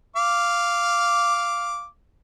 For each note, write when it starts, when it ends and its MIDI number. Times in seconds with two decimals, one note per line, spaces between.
0.16 1.86 77
0.16 1.86 86